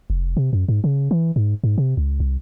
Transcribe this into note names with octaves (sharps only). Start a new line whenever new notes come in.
F1
C3
F#2
G#2
C#3
E3
G#2
G#2
C3
C#2
C2